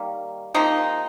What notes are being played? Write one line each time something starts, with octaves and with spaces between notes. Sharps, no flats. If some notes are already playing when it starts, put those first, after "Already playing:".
Already playing: D#3 G3 A#3
C3 F3 A#3 D#4